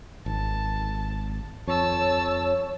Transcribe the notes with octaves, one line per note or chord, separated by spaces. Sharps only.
G#1 A5
F2 C#5 A5 E6